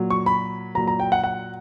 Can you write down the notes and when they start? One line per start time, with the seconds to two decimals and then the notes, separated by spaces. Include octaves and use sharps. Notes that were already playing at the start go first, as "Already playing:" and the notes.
Already playing: A#2 F#3
0.10 C#6
0.26 B5
0.75 A#2 F#3 A#5
0.88 A#5
1.00 G5
1.12 F#5
1.24 F#5